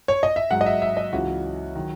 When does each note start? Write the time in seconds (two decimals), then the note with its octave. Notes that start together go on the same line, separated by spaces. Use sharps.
0.08 C#5
0.23 D#5
0.36 E5
0.51 G#2 F#3 F#5
0.61 D#5
0.66 E5
0.82 E5
0.97 D#5
1.13 C#2 C#3 E3 F#4
1.75 D#3 F#3